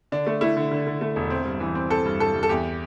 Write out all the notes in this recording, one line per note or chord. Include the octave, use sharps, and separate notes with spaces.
D3 D4
A3
A3 E4
D3
D3
D3
A3
E1
C4
G2
E3
C4
C4 A4
G2
G2 A4
G2
A4
E2 G4